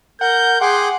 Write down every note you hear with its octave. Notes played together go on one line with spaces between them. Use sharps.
A#4 F#5 G6
G#4 F#5 G5 C6 D6